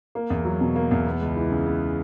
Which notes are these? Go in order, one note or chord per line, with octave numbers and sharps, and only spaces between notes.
A#3
E2
F#3
B2
A#3
E2
B3
C#2
E3
C#3
B3